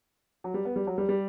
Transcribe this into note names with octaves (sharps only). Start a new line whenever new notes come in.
F#3
G3
B3
G3
F#3
G3
G3